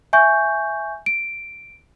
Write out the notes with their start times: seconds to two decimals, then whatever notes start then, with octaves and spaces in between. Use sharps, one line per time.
0.13 E5 G#5 C#6 G6
1.06 D7